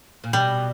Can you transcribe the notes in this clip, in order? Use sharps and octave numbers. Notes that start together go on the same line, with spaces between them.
A#2
B2 G3